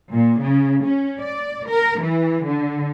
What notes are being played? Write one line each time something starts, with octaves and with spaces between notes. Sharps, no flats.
A#2
C#3
C#4
D5
A#4
E3
D3